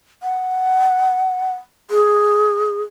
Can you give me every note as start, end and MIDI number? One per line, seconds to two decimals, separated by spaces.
0.23 1.51 78
1.91 2.82 68